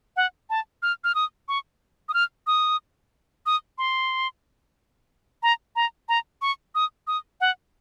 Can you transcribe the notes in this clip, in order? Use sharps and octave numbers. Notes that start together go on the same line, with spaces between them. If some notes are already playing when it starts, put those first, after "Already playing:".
F#5
A5
F6
F6
D#6
C#6
D#6
F6
D#6
D#6
C6
A#5
A#5
A#5
C#6
D#6
D#6
F#5